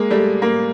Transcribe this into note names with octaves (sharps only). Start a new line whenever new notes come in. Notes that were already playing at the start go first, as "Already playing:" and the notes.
Already playing: G#3 A#3
G3 A3
A#3